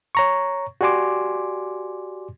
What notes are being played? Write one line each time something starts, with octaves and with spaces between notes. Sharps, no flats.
C#5 A#5 C#6
F#4 G4 D5 G#5 C6 D6